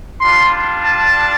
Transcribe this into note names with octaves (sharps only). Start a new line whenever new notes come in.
G3 D4 F4 C6
A5